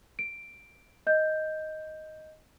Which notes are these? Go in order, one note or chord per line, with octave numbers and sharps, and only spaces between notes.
D7
D#5 G6